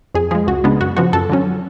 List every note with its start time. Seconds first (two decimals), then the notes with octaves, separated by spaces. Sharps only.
0.15 F2 G#4
0.31 F3 G#3 G#4
0.47 C#2 F#4
0.64 C#3 G#3 B3 D4
0.80 F#2 F#4
0.97 C#3 F3 B3 F#4
1.13 F#2 A4
1.29 D3 F#3 C#4